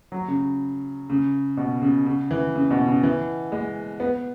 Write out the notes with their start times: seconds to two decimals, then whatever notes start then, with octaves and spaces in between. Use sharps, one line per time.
0.12 F#3
0.28 C#3
1.10 C#3
1.57 B2
1.82 C#3
2.06 C#3
2.31 E3
2.55 C#3
2.71 B2
2.88 C#3
3.03 E3
3.52 G#3
4.00 B3